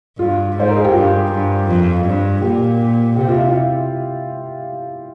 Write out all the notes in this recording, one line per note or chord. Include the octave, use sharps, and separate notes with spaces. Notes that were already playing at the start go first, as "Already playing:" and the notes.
G2 F4
G#2 C5
A#4
G#4
G4
G2 F4
G2
F2
G2
A#2 G4
C3 G4
F4
E4
F4